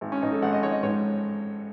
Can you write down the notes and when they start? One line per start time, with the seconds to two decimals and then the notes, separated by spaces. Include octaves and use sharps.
0.01 G#1
0.12 C#4
0.22 G#2 D#4
0.32 A4
0.42 G#1 F#5
0.53 D#5
0.63 G#1 C#5
0.72 D#5
0.83 G#2 C#5